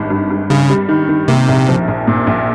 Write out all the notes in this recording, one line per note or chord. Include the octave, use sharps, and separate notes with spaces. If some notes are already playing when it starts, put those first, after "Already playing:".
Already playing: G#1 G2
G2
G2
G2 C#3
G3
D#3
D#3
C3 A#3
A#1
F3
A#1
A#2
A#1